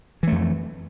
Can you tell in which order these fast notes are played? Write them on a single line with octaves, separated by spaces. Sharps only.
E3 A3 F2